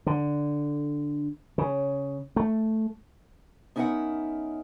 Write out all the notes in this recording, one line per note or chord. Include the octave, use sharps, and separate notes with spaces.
D3
C#3
A3
B3 C#4 D#4 A#4 E5 F#5